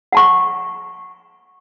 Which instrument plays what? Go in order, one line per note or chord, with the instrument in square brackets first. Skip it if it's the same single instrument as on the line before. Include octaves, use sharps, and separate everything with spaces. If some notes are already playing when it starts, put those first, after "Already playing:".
[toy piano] F#5 A5 C#6